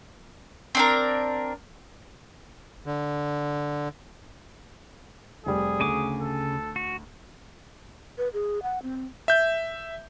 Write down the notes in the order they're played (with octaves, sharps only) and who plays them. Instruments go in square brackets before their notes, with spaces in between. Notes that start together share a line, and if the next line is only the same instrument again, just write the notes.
[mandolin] C4 D4 A#4
[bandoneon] D3
[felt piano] F1 G3 [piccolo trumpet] G#4
[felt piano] D2 [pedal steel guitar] C#3 G#5 D6
[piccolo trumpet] A4
[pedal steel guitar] F#4
[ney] B4
G#4
F#5
C4
[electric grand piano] E5 G6